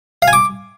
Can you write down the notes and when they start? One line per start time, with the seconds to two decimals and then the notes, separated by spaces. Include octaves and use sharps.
0.22 F5
0.28 G#5
0.33 D6